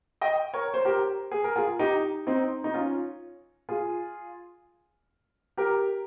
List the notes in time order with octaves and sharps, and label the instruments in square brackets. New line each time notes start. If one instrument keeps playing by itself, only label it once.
[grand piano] D#5 G5
A#4 C#5
C5
G4 A#4
G#4
A#4
F4 G#4
D#4 G4
C4 D#4
D#4
C#4 F4
F4 G#4
G4 A#4